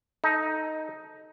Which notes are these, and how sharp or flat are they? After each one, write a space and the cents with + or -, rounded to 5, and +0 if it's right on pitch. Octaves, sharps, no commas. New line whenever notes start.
D#4 +5 A4 +0